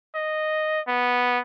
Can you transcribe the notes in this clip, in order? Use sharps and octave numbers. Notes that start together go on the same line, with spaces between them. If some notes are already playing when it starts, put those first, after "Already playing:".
D#5
B3